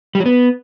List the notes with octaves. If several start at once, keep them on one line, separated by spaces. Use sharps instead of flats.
G3
F#3
B3